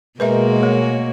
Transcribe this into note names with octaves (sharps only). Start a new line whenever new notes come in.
B2 G#3 A#3 F#4 A#4 B4 D#5 E5
A3 C#5